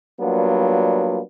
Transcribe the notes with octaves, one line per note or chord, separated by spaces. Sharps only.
F#3 G3 A#3 B3 D4 F4